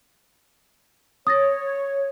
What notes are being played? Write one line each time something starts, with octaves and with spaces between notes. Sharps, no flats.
C#5 D#6 A6 A#6